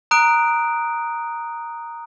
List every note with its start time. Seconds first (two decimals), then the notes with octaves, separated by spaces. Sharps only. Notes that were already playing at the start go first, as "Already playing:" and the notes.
0.11 A#5 D#6 F#6 D7